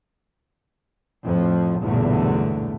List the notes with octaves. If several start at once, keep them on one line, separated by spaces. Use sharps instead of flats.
F2 A2 F3
B1 E2 G2 A#2 D3 A3